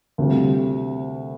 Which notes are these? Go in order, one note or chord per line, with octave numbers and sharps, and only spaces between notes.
D2 C3 G3 C4 F4